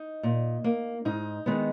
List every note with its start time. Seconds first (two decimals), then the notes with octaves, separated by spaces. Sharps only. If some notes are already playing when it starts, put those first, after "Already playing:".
Already playing: D#4
0.23 A#2
0.64 A#3
1.05 G#2 D#4
1.46 D#3 G#3 B3